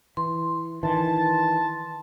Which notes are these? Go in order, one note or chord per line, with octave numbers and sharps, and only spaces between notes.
E3 C6
D#3 E3 A5